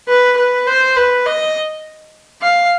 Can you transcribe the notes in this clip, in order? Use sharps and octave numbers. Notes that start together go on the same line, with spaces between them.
B4
B4
C5
B4
D#5
F5